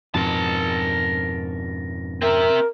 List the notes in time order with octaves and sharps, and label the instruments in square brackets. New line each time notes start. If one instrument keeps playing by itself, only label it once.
[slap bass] F2 G#2 B2 [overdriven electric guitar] A#4 A5
[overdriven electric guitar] C4 E5 [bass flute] A#4